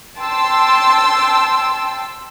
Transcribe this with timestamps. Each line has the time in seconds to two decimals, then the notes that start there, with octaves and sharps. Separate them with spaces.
0.18 G5 A5 C6 E6